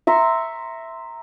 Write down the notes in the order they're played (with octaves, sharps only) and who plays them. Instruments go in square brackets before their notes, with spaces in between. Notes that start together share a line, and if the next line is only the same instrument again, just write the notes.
[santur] E5 A#5 C6 C#6